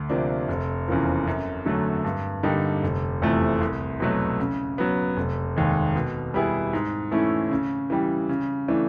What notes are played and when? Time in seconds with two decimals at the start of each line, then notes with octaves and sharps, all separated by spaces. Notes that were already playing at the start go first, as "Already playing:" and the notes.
Already playing: D2
0.09 C3 F3 A#3 D4
0.48 F1
0.88 E2 C#3 F3 A#3
1.27 F#2
1.65 D3 F#3 A3
2.04 G2
2.43 D3 G3 A#3 D#4
2.83 F1
3.22 E2 C3 F3 A3
3.61 C2
4.00 B2 F#3 A3
4.39 C#3
4.78 F#3 B3
5.17 F1
5.56 D#2 D#3 G#3
5.95 B2
6.34 G3 B3 E4 G#4
6.73 G#2
7.12 E3 A3 C#4 E4
7.51 C#3
7.90 E3 G3
8.29 C#3
8.68 E3 A3 D4